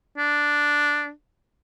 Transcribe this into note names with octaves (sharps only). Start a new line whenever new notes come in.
D4